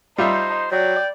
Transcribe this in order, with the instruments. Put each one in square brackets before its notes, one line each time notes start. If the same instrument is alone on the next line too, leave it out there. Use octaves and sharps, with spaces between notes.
[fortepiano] G3 F4 E5 [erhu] D#4 [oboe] C5
[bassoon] F#3 [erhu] D5 [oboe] G5